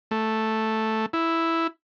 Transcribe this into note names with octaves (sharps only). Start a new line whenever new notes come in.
A3
E4